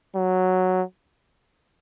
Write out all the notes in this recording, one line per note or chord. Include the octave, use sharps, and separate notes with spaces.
F#3